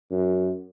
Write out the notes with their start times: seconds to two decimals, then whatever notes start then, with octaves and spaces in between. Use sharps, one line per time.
0.11 F#2